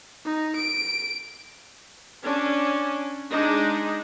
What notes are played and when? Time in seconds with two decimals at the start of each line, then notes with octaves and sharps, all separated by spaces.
0.25 D#4
0.56 D7
2.23 C#4 D4
3.30 G#3 D4 D#4